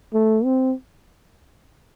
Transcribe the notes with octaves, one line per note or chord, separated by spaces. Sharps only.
A3
C4